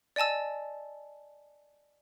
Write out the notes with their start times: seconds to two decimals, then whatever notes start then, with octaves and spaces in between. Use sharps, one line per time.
0.16 D5 D#5 G#5 A5 E6